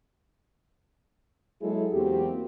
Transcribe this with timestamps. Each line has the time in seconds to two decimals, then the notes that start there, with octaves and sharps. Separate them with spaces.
1.62 F#3 G#3 A#3 E4 G#4 A4
1.93 E2 A#3 C4 F#4 G4